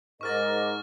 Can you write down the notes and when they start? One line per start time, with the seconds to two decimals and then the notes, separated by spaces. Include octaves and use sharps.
0.21 G#2 A#4 D#5 C#6 D6 F6 A6